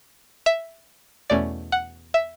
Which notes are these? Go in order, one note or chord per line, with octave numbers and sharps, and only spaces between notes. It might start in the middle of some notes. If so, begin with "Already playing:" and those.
E5
E2 B2 A3 C#4 D5
F#5
E5